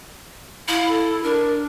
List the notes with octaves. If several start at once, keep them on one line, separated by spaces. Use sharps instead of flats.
E4 F5
A4
D4 A#4